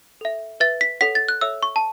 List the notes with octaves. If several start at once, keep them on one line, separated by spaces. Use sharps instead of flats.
A4 E5
B4 E5 A6
B6
A4 C#5 F#5 B6
A6
F#6
A4 C#5 E5 E6
C#6
A5